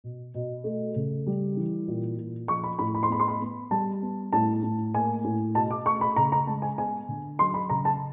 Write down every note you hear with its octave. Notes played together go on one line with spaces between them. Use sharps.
B2
B2
A3
C#3
G3
E3
A#2
A#2
F3 C#6
B5
A2 B5
B5
C6
B3 B5
C6
B5
B3
G3 A5
B3
A2 A5
A2
A#3 G#5
A2
B2 A5
D6
A3 C#6
B5
C#3 A#5
A#5
G#3 A5
G#5
B3 G#5
D3
F#3 C6
B5
C#3 A#5
A5